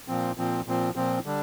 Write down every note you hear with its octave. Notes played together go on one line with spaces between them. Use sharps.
A#2 F3 C4
A#2 F3 C4
A#2 F3 C4
A#2 F3 C4
D3 G3 D4